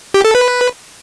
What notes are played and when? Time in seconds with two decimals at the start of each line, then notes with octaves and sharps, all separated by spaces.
0.14 G4
0.25 A4
0.35 B4